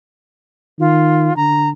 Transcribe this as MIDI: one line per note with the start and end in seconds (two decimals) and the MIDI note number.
0.80 1.29 51
0.80 1.36 65
1.36 1.73 50
1.36 1.69 82